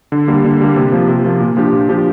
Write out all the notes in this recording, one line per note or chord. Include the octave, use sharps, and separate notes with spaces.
D3
G3 A#3
D3
G3 A#3
C3
F3 A#3
C3
F3 A#3
A#2
F3 D4 G4
A#2
F3 D4 G4